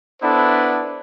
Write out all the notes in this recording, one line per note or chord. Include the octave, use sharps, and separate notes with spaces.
B3 D4 E4 A4 B4 C5